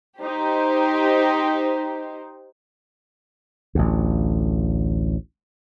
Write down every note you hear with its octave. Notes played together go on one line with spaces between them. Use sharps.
D#4 G4 C5
A1 D2